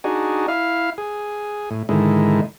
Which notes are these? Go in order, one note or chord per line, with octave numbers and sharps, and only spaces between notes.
D4 D#4 F#4 G#4
E4 F5
G#4
A2
G#2 D3 D#3 G#3 E4